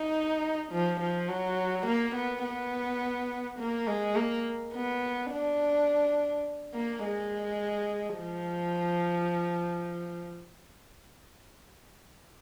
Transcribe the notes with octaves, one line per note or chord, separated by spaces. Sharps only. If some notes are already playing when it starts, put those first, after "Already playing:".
Already playing: D#4
F3
F3
F#3
A#3
B3
B3
A#3
G#3
A#3
B3
D4
A#3
G#3
F3